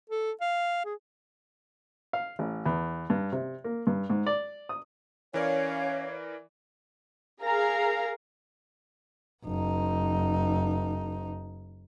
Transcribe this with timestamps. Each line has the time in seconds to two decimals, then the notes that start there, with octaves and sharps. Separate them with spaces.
0.10 A4
0.41 F5
0.85 G#4
2.13 F5
2.39 A1
2.66 E2
3.10 G2
3.32 C3
3.64 A#3
3.87 G2
4.10 G#2
4.26 D5
4.69 D#6
5.34 E3 C#4 A#4 C#5 D5 F5
7.42 G#4 A#4 F5 A#5
9.45 F#1 D#4